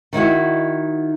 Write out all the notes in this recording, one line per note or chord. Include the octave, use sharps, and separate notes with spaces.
D#3 D#4 E4 F#4